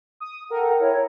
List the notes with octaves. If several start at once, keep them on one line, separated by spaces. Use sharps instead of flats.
D#6
A4 A#4 F#5 G5
E4 C#5